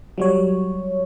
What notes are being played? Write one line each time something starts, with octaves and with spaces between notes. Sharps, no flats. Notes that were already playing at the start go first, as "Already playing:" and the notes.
F#3 G3 C#5